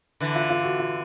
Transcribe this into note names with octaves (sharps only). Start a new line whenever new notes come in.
D3 E3
F4
F4
F#4
F4